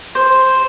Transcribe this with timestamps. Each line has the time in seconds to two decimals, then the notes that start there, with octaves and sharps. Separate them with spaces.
0.15 C5